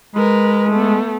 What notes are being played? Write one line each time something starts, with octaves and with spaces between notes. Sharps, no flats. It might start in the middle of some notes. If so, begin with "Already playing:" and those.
G#3 A#4 B4
A3 B3